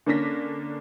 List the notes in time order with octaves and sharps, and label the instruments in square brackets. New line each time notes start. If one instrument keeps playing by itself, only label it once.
[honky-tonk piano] D3 A#3 C#4 D4 A#6 B6